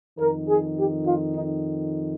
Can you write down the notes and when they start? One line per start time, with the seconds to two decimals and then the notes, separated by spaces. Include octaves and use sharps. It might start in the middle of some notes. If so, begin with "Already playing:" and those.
0.19 F2 D#3 A#4
0.47 G#4
0.77 G4
1.05 F4
1.33 D#4